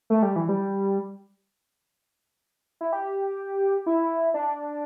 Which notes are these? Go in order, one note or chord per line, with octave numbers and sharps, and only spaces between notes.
A3
G3
E3
G3
E4
G4
E4
D4